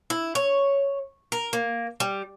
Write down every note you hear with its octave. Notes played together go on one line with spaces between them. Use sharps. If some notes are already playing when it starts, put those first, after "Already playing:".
E4
C#5
A#4
A#3
G3